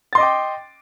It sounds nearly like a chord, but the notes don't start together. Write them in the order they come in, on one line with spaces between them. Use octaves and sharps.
A6 C6 D#5 D6 G5